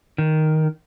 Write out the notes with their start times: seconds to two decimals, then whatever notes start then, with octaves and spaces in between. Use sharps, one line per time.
0.18 D#3